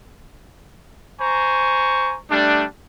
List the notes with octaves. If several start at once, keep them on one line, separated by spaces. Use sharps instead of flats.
C5 G#5 A#5 C#6
G3 A3 D4